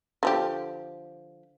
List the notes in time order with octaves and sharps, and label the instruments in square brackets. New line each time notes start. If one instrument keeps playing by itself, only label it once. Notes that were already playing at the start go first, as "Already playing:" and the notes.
[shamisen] D3 F3 G4